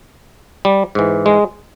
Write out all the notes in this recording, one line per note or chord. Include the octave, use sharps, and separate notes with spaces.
G3
G#2 E3
G#3